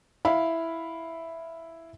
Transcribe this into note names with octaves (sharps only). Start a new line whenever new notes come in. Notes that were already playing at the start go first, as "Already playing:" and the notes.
E4 F5 B5